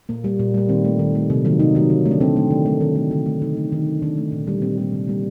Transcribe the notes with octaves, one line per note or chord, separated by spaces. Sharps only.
A#2 A#3
G3 A#3
A#2
G3 A#3
D#3 C4
A3
D#3
A3
C3
D#3 F#3 A#3
C3 D#4
D#3 F#3 A#3
D3
A3
D4
D3 C4
A3
D#3
A3
D#3
A3
D3
A3
D3 D#4
A3
D#3
A3
D#3 D4
A3
A#2
G3 A#3
A#2 C4
G3 A#3
C3 A#3
G3 A#3